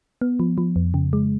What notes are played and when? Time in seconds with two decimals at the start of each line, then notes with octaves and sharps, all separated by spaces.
0.21 B3
0.40 F3
0.58 F3
0.76 F2
0.94 C#3
1.13 G#3